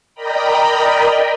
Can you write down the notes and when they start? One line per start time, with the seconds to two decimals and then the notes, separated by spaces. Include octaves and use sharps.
0.14 A#4 D5 D#5 G5 A#5 B5